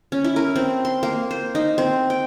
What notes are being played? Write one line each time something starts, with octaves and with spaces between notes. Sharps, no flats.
C#4
E4
A#4
C4
C6
A#3
C5
D#4
C4
G5